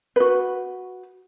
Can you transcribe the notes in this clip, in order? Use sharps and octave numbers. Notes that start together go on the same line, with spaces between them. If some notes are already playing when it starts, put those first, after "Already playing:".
F#4 B4